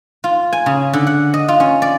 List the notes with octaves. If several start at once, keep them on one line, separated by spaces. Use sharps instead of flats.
F4
G#5
C#3
D3
F#5
D#5
F4
C#4
D5